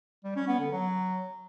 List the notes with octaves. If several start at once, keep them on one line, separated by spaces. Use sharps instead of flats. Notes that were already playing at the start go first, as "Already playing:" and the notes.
G3
C#4
B3
D3
F#3